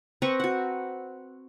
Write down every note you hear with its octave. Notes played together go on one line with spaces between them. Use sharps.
C4 B4 A#5 C#6
F#4 F#5